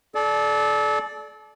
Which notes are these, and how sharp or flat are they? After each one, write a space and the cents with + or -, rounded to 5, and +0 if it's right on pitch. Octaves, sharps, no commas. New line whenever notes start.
A4 -35 D5 +0